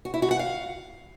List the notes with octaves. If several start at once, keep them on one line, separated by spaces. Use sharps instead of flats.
F#4
E4
F#4
F#5
F5